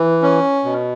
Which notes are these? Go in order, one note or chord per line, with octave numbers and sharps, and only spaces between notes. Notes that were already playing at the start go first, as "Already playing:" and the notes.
Already playing: E3
C#4
B2